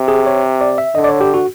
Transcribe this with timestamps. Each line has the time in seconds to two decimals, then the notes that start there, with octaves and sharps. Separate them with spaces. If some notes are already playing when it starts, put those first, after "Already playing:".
Already playing: C3
0.08 G#4
0.26 C#5
0.61 D5
0.78 E5
0.95 D3 D#5
1.04 D5
1.09 C#5
1.21 G4
1.34 F#4